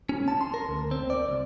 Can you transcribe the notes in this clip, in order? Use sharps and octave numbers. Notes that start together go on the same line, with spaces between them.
C#4
A5
C6
A#4
D2
C4
D5
C2